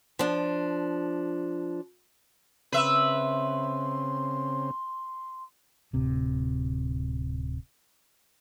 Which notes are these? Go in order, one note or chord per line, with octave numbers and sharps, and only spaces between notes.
F3 D4
C#3 C4 B4 E5 C6
D1 C3